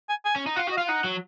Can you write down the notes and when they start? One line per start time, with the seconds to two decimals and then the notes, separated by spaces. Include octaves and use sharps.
0.09 G#5
0.25 G#5
0.36 C#4
0.47 D#4
0.56 F4 F#5
0.67 F#4
0.72 D#5
0.77 F4 F5
0.87 D#4 F#5
1.04 F#3